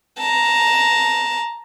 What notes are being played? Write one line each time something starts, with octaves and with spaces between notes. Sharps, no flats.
A5 A#5